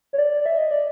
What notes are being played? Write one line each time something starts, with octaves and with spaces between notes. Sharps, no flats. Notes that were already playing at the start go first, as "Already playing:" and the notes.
C#5
D5
E5
D#5
D5